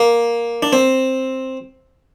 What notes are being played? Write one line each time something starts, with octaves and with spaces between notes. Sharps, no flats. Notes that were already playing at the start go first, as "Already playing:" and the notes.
Already playing: A#3
D4
C4